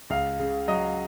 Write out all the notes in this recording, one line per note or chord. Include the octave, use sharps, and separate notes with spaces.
C#2 F5
C#3
F#3 D#5